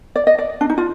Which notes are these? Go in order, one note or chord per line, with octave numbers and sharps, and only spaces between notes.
D5
D#5
D5
D4
D#4
F4